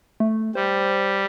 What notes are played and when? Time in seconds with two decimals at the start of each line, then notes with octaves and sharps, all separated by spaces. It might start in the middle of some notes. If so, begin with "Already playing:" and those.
0.20 A3
0.55 G3 C5